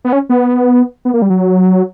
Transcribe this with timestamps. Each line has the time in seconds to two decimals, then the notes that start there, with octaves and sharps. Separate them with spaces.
0.05 B3
0.13 C#4
0.29 B3
1.05 B3
1.14 A#3
1.22 G3
1.30 F#3